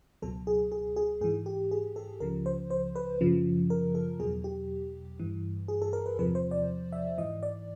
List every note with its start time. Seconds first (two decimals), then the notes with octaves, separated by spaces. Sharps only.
0.22 C#2 B2 F#3 A4
0.47 G#4
0.72 G#4
0.96 G#4
1.21 G#2 G#4
1.24 E3
1.46 G4
1.71 G#4
1.96 A4
2.20 C#2 C#3 F3 A#4
2.46 C5
2.70 C5
2.96 B4
3.21 F#2 C#3 F3
3.70 A#4
3.95 A4
4.19 E2 B2 F#3 G#4
4.44 G4
5.20 G2 E3
5.68 G#4
5.82 A4
5.93 A#4
6.06 B4
6.18 E2 C3 F3 B4
6.35 C5
6.51 D5
6.92 E5
7.18 G#2 E3 D#5
7.43 D5